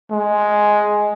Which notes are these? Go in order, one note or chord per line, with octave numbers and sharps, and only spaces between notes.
G#3